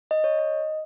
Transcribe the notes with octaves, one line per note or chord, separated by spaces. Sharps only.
D#5
C#5
D#5